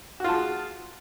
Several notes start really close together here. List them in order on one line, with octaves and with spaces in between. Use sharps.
F#4 F4 A5 G#4